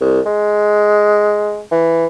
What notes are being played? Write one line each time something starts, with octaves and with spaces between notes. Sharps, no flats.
C2
G#3
E3